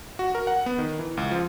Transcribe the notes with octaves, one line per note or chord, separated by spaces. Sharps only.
F#4
A#4
F#5
B3
D#3
E3
C#2
F3